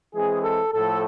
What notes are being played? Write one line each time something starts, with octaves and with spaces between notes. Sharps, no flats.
E3 G#3 C4 G#4
A4
A2 F3 A3 A4